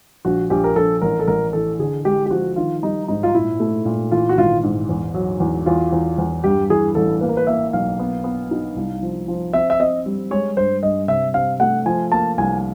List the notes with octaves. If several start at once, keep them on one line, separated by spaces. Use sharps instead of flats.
A#1 F#4
A#1 G4
A#4
A#1 A4
A1 A#4
A4
A1 A#4
E3 A4
D3 G#4
G#3 G4
G4
F3 F#4
D#3 F4
G3 D#4
G#2 D#4
F4
A#2 E4
A3
A#2
E3 F4
F#4
G#1 F4
G#2
E2
F#3
E2
E2 F4
E2
E2
G2 G4
E3 G#4
A1 A4
A#3 B4
A#4
B4
A#3 E5
B1 F5
B3
B3
D#4
C2
F3
F3
C4 E5
E5
C4 D#5
G3
G#3 C#5
G2 C5
G2 D#5
C3 E5
C3 F5
A3 F#5
F3 G#5
A#3 A5
C2 G#5